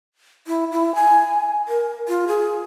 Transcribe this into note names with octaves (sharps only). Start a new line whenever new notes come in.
E4
E4
G#5
A#4
F4
G#4